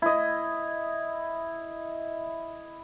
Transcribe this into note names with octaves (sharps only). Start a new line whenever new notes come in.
E4 D#5